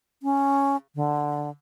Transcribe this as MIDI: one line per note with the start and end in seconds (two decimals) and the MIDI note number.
0.23 0.76 61
0.95 1.50 50